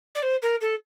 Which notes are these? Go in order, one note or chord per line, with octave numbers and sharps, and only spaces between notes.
D5
C5
A#4
A4